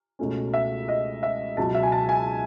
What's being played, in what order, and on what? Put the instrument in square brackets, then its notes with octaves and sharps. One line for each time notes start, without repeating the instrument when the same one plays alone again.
[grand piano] C#2 B2 A3 C#4
E5
D#5
E5
C#2 B2 F#3 A5
E5
G#5
A5
G#5